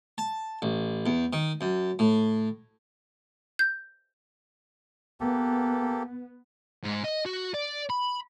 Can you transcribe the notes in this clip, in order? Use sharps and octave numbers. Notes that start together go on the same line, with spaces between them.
A5
A1
E2
D#3
F#2
A2
G6
A#3 B3 G4 A4
G#2
D#5
F#4
D5
B5